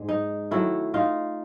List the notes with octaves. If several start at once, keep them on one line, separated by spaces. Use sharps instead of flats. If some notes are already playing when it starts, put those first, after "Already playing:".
Already playing: G#2 G#3
D#4
D#3 F#3 A3 E4
D#4 F4